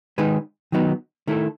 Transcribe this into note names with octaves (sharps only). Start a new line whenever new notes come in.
D#3 G#3 D#4 G#4 B4
D#3 F#3 B3 D#4
D#3 A3 E4 A4